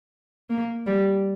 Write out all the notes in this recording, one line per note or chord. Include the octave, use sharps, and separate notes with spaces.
A#3
G3